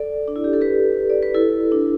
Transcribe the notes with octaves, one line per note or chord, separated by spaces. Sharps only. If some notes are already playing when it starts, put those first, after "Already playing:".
Already playing: A4 D5
D4
E4
G4
A4
G4 B4
D5
B4
E4 A4
D4